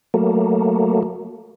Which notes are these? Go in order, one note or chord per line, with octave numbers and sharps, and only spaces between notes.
F#3 A3 A#3